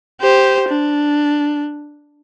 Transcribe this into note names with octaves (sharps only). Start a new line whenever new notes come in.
G4 C5
D4